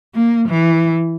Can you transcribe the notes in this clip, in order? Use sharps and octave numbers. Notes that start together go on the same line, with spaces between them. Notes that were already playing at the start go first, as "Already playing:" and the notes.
A#3
E3